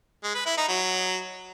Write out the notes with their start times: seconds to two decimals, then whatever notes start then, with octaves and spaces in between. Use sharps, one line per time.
0.24 G#3
0.35 B4
0.46 E4
0.57 D#4
0.68 F#3